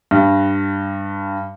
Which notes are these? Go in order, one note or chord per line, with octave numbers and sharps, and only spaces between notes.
G2